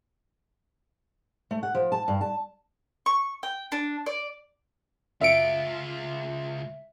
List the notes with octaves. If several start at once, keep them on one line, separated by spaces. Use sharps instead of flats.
A3
F#5
F3
A5
G2
A5
C#6
G5
D4
D5
C#2 F#2 F4 E5 C#7 D7